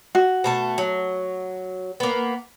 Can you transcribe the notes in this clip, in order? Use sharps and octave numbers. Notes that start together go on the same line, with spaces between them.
F#4
B2 A3 A5
F#3
A#3 B3